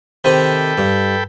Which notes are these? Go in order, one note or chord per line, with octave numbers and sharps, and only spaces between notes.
C3 D#3 C4 A4 G5 B5
G2